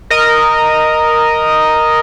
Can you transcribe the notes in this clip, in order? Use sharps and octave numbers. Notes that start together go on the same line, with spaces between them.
A#4 D#5